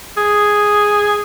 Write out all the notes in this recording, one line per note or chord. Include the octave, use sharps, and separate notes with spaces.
G#4